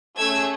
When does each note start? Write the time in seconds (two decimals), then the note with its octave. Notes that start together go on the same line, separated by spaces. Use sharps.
0.17 A3 C#4 G#4 E6 G#6